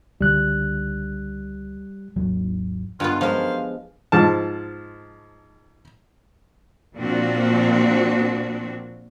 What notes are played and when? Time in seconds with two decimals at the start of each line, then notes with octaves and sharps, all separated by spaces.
0.21 C#2 D3 G3 F#6
2.16 G#1 D#2 F#3
3.00 G2 G#3 B3 F4
3.21 F#2 F3 G#3 C5 F5
4.12 G#2 F3 A5
6.96 A#2 F3 A#3 C4 D4 F#4